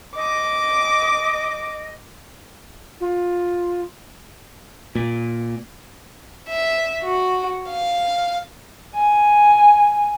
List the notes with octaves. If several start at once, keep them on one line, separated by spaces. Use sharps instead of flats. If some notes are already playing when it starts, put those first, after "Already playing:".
D#5 D6
F4
A#2
E5
F#4
F5
G#5